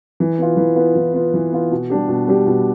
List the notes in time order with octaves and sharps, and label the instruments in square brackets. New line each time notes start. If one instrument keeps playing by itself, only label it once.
[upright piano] E3
B3 F4
E3
B3 F4
E3
B3 F4
E3
B3 F4
B2
G3 D4 G4
B2
G3 D4 G4
B2